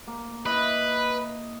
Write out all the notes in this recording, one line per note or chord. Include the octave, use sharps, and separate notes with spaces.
A#3
E4 B4 D#5